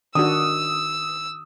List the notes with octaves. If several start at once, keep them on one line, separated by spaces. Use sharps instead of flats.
D#3 D4 F#4 D#6 E6